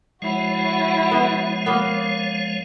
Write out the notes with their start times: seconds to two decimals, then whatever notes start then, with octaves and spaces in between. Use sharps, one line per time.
0.22 F3 G#3 E4 F#4 C#5
1.11 B3
1.66 A#3 B3